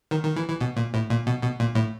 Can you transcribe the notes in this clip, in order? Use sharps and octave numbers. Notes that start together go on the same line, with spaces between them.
D#3
D#3
E3
E3
B2
A#2
A2
A#2
B2
B2
A#2
A2